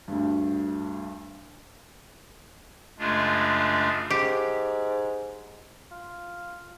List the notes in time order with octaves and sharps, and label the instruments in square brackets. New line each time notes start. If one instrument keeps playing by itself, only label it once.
[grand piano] D2 G2
[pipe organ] F#2 C#3 G#3 A3 D4 F4
[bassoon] G#2 [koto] G4
[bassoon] F4